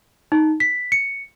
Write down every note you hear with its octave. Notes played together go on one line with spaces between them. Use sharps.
D#4
B6
C#7